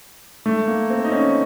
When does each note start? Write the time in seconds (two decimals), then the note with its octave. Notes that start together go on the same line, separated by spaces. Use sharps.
0.46 A3
0.68 A#3
0.90 C4
1.05 D#4
1.12 C#4